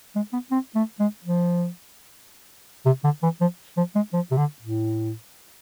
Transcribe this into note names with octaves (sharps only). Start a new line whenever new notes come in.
G#3
B3
C4
A3
G#3
F3
C3
D3
E3
F3
F3
G#3
F3
C3
D3
A2